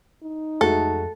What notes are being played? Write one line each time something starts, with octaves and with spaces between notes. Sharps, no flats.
D#4
F2 G#3 A3 F#4 A4